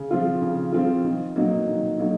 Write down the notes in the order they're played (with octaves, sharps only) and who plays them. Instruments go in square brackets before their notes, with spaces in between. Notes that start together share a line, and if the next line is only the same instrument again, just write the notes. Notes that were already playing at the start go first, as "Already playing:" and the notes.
Already playing: [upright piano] C#3
F3 C4 F4
C#3
F3 C4 F4
D#3
F#3 A#3 D#4 F#4
D#3
F#3 A#3 D#4 F#4